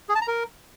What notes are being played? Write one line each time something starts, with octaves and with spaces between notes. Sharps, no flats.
G#4
A5
A#5
A#4